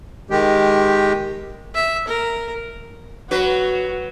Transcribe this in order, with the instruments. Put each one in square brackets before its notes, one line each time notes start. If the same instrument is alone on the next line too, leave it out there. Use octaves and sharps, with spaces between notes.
[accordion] D#3 G#3 G4
[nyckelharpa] E5
A#4
[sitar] F#3 B4 [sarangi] F#4